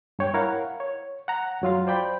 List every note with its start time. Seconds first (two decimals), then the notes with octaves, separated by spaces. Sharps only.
0.19 G2 C#5 G5
0.34 E4 A#4 C#5 F5 F#5
0.80 C#5
1.28 F#5 A#5
1.62 F#2 F#3 F4 F5
1.87 C5 D5 G5 B5